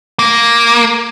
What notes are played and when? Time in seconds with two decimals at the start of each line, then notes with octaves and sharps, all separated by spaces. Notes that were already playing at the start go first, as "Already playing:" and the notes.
0.19 A#3